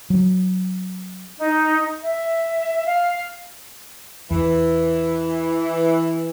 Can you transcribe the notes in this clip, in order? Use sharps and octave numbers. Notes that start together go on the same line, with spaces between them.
F#3
D#4
E5
F5
E2 E3